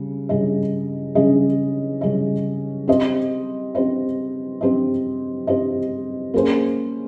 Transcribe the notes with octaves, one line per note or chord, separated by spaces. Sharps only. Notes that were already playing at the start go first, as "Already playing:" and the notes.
Already playing: C#3 G3
C#3 G3 C#4 G#4 D#5
C#3 G3 C#4 G#4 D#5
C#3 G3 C#4 G#4 D#5
C4 G4 C5 D#5
C4 G4 C5 D#5
C4 G4 C5 D#5
C4 G4 C5 D#5
A#3 C#4 G#4 C5